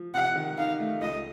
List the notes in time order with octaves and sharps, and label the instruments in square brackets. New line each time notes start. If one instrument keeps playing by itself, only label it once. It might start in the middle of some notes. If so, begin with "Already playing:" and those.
Already playing: [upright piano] F3
[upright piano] C3 [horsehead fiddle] F#5
[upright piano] D#3
[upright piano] D#4 [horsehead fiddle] F5
[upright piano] A3
[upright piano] C#2 [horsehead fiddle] D#5